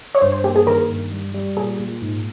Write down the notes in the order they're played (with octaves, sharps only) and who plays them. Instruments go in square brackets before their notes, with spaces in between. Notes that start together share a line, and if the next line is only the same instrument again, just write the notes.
[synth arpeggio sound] C#5
[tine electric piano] G2 [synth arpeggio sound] C5
[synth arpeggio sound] C5
[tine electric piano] A#3 [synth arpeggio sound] G4
[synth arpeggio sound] G#4
[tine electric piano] D#3 [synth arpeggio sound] A#4
[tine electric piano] G2
G3
G3
[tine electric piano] A#2 [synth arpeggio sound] G#4
[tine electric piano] A#2
G#2